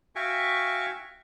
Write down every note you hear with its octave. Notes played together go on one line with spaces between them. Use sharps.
F#4 E5 F5 G5 G#5 C#6